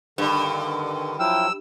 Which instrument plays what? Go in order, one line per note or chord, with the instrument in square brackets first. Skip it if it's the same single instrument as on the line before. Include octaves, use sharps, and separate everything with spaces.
[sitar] G2 [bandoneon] D3 D#3
[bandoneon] F3 F#3 [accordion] E4 G5 F6 [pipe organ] E6